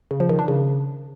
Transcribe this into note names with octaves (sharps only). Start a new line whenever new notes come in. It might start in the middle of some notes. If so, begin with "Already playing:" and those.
C#3
F3
D#3
D4
C#3